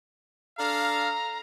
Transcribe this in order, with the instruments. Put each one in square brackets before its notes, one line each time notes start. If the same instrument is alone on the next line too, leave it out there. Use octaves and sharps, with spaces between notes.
[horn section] D4 A4 F5 [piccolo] A#5